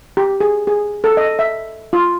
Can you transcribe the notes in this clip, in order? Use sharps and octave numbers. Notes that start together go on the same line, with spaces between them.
G4
G#4
G#4
A4
D#5
E5
F4